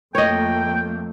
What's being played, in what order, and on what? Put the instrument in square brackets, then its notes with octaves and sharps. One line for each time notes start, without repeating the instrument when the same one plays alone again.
[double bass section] F2 A3 A#3 [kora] C#5 D#5 [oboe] G5